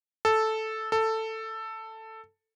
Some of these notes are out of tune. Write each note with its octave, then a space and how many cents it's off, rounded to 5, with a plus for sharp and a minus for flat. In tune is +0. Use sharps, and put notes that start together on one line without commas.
A4 -5
A4 +10